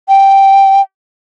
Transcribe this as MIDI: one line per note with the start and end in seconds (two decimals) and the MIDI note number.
0.09 0.81 79